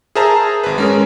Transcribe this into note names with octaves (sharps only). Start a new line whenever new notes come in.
G#4 A#4 C5 E5 A5 A#5
G#1 B4
G#3 C#4 A#4